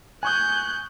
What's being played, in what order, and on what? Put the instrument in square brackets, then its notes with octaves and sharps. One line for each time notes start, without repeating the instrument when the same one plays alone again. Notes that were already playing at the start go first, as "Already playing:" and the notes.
[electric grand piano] G#5 C#6 D#6 [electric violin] F#6 G6